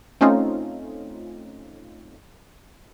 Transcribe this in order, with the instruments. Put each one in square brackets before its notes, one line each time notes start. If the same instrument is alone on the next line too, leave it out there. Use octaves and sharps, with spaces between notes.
[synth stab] A3 C4 C#4 D#4 F4